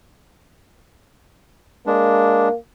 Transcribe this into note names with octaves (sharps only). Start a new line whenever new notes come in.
G#3 A#3 D4